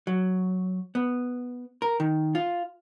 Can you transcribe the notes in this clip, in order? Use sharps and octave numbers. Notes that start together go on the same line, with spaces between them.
F#3
B3
A#4
D#3
F4